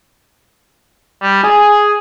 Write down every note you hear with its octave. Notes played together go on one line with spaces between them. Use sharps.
G3
G#4 G#5